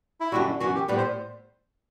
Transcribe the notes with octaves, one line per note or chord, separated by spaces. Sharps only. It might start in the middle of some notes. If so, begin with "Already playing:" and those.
E4
F#2 D3 G3 F#4
F#2 E3 B3 F#4
G4
A2 G3 B3 B4
C5